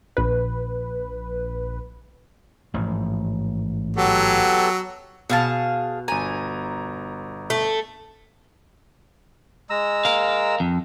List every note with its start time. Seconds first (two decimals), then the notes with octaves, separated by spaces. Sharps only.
0.17 A#1 B4
2.74 A1 G#2 F3
3.97 F#3 B3 G4 A4
5.30 B2 G#4 F5 A5
6.08 G1 G#5 A#5
7.50 A3
9.70 G#3 A#5 E6
10.05 A#4 F5
10.60 F2